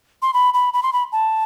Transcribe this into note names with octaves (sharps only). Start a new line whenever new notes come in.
C6
B5
B5
B5
C6
B5
A5